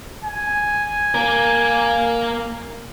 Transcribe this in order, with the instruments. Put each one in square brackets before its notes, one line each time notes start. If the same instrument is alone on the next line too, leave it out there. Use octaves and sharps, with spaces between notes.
[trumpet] G#5
[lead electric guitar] A#3 A#4